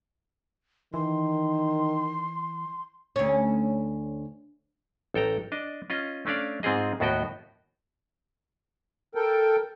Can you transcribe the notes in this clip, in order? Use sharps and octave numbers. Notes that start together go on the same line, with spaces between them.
D#3 E3 C6
D2 C#4
A1 A4 G5 A#5
D4 D#5
C#4 F4 D#5
A3 C#4 D4 D5 F5
G#2 C4 F4 G#4 D#5
D#2 A2 B3 F#4 D#5 G5
A4 A#4 G5